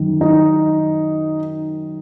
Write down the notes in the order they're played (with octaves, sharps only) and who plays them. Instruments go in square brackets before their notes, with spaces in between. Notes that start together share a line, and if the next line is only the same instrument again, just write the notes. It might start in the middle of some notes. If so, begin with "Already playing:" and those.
Already playing: [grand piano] F#2 D#3
D#4